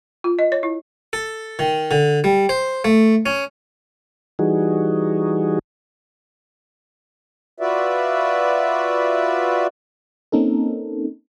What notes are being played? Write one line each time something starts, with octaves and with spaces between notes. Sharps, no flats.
F4
D#5
C#5
E4
A4
D#3
D3
G3
C5
A3
C#4
E3 G3 D#4 F#4 G#4
F4 F#4 B4 D5 E5
A#3 C4 C#4 D#4 A4 A#4